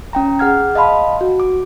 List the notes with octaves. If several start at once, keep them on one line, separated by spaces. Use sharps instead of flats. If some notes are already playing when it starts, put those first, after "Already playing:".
C#4 G5 A#5
G#4 F#5 F6 G#6
D#5 F5 A5 B5 C6
F#4
D6